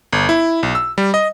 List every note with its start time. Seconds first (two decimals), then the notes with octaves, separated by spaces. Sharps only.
0.13 G1
0.29 E4
0.63 B1
0.75 E6
0.98 G3
1.14 D#5